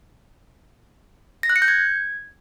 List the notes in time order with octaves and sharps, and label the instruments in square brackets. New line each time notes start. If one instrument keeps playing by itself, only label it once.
[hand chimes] A#6
F#6
C#7
G6
G#6